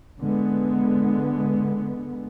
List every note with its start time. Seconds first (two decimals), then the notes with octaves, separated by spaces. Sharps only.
0.20 D3 G#3 B3